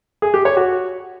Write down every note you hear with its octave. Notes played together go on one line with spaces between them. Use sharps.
G#4
G4
C#5
F#4